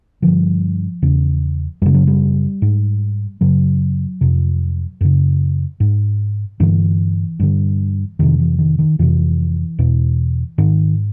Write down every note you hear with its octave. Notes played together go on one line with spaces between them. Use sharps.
G2 D3 F3
E2 C#3
F#2 C#3 G3
F#3
G3
G#2
F#2 C#3 F#3
F2 C3
F#2 C#3
G#2
G2 D3 E3
G2 D3
F2 C3 D#3
E3
D#3
D#3
F2 C3 E3
E2 B2
G#2 D#3